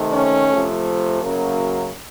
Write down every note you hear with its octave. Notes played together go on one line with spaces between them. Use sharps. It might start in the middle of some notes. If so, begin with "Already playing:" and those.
Already playing: C3 D#3 A3
C#4
C3 F3 A3
F#2 C#3 F#3 A#3